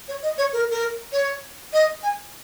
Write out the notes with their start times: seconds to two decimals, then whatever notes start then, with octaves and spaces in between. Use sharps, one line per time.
0.08 C#5
0.23 D#5
0.38 C#5
0.53 A#4
0.71 A#4
1.12 C#5
1.73 D#5
2.03 G#5